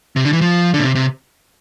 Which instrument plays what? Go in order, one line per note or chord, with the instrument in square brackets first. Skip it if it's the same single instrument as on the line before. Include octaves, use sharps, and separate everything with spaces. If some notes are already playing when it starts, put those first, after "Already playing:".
[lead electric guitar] C3
D3
E3
F3
A#2 D3
C3
C3